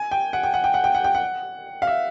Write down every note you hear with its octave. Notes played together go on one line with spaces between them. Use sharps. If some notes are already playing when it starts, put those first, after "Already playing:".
Already playing: G#5
G5
F#5
G5
F#5
G5
F#5
G5
F#5
G5
F#5
F5
E5